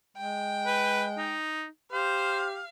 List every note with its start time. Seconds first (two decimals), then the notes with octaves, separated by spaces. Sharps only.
0.17 G#3 G5
0.67 B4
1.18 D#4
1.92 G4 C5 F5